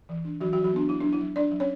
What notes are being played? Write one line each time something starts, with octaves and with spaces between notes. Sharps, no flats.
E3
D4
E3 F#3 F#4
F#3 F#4
E3
F#3 F#4
B3 D4
F#3 E4
F#3 D4
E4
F#3
D4 D5
F#3
C#4 C#5